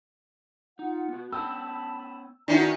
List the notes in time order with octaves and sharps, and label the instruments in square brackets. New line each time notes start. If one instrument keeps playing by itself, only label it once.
[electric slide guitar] D#4 [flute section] F4 F#5
[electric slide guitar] B3 F#4
[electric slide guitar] B3 C#4 G5 [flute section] A5 B5 [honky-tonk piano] E6
[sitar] D#3 B3 C#4 [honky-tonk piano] D4 E4 F#4 [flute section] E5 A#5